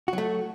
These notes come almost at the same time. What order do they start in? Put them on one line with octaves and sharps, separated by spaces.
F#4 F#3 A3